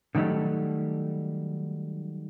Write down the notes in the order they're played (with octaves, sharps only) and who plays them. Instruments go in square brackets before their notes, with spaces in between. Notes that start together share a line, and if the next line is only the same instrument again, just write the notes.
[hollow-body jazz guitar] D3 D#3 F#3 G3 A3